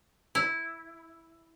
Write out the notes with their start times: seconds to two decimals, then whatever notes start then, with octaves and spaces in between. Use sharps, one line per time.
0.35 E4